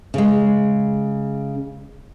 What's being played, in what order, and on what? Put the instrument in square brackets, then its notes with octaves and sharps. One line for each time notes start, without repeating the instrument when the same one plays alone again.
[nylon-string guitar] C#3 G#3